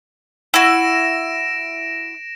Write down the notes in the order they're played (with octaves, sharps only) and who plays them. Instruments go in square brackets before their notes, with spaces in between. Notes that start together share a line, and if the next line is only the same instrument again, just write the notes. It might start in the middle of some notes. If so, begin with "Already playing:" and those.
[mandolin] E4 F#4 [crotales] A#6 D7 E7